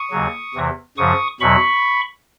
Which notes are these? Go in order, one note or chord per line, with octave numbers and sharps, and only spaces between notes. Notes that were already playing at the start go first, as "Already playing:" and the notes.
Already playing: C#6 D#6
D#2 C#3 F#3
E2 C3 E3
F#2 C#3 F3 C#6 D#6
E2 B2 F#3 B5 C#6